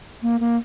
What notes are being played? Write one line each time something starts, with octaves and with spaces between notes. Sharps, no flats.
A#3
A#3